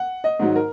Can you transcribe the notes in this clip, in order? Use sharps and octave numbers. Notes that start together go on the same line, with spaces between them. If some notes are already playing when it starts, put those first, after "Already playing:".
Already playing: F#5
D#5
G#2 D#3 F#3
A#4